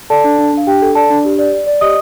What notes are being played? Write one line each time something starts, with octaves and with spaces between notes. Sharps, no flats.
A4 D5 A5
D4
D4
D4 F5
D4 G4 G5
A4
A4 D5 A5
D4
G4
D5
D5
D5
G4 D#5 D#6